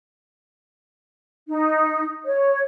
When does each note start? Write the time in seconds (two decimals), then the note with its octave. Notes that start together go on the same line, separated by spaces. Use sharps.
1.48 D#4
2.25 C#5